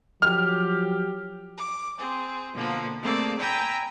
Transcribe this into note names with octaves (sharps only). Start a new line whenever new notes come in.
F3 F#3 G4 F6
D6
C4 G#4
B2 D3 F3 A#3
A3 A#3 C4 G#4 D5 A5
G5 G#5 A#5 B5 E6 G6